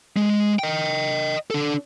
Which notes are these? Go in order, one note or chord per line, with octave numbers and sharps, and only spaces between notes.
G#3
D#5 G5
D4 A4